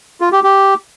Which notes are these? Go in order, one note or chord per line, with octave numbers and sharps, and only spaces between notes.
F4
G4
G4